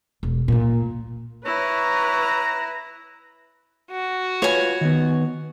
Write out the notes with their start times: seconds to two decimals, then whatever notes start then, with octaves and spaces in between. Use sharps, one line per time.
0.23 E1
0.48 A#2 A#3
1.45 E4 B4 C#5 A#5
3.91 F#4
4.42 F4 B4 C#5 G#5
4.81 D#3 B3